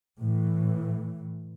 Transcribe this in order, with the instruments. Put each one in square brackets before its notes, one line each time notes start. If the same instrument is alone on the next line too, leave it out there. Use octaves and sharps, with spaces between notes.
[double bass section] A2 E3